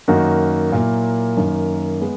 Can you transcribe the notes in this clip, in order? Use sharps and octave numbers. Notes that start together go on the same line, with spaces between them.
F#2 D#3 A#3 D#4 F#4
A#2 F#3 A#3 E4
F#2 D#3 A#3
G#3 B3